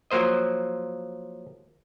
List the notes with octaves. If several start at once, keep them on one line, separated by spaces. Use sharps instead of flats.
F3 F#3 A#3 C5 D#5